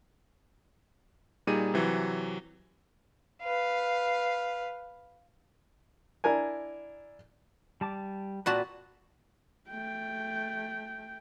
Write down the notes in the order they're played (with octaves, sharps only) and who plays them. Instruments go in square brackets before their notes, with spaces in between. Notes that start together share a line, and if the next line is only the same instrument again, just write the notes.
[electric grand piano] A#2 G3 D#4 G#4 D#7
C3 E3 F#3
[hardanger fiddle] B4 F5
[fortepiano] D4 E4 A#4 G#5
[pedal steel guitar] G3 A5 D6
[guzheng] A#2 F#4 A5 [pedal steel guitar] C4 B4
[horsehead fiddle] A3 G5